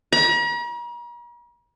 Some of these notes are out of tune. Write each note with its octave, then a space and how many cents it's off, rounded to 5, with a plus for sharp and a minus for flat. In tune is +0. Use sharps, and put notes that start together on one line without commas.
A#5 +45